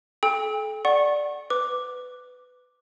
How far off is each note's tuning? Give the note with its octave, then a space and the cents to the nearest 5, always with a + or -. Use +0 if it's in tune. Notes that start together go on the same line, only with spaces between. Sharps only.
A4 -35 G5 +35 E6 -35
D5 +0 F#5 +0 C#6 -30
B4 +15 D6 +0